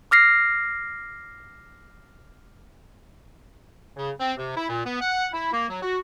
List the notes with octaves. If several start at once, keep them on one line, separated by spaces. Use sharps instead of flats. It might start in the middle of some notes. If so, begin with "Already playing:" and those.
D6 F6 A#6 C7
C#3
C4
C3
E4
A#2
B3
F#5
E4
A#3
F#3
F#4